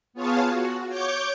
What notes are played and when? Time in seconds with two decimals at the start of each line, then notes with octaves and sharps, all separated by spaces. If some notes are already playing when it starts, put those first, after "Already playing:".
0.13 B3 F4 G#4 C#5 F5 A5
0.46 F#4
0.88 C#5 C#6 D6 G6